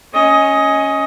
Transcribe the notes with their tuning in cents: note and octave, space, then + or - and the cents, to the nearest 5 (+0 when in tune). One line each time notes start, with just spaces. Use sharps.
C#4 +0 D#5 +15